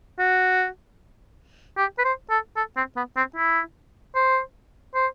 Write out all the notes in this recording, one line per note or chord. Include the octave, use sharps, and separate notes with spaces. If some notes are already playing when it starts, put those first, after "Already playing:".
F#4
G4
B4
C5
A4
A4
C4
B3
C4
E4
C5
C5